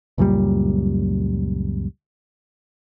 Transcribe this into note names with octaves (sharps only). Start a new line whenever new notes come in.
C#2 F#2 A#2 G3